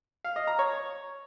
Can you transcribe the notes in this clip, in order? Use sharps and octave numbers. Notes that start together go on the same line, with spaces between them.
F5
D#5
A#5
C#5